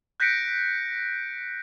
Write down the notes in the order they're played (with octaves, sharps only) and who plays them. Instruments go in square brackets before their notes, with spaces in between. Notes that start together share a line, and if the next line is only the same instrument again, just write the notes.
[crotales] F#6 G6 A#6 B6 C#7 D7